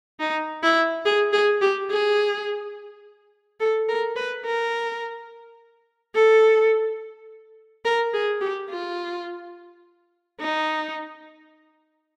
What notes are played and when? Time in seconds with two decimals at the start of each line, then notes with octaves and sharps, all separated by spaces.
0.20 D#4
0.63 E4
1.06 G#4
1.33 G#4
1.61 G4
1.91 G#4
3.60 A4
3.89 A#4
4.16 B4
4.46 A#4
6.14 A4
7.85 A#4
8.14 G#4
8.41 G4
8.70 F4
10.41 D#4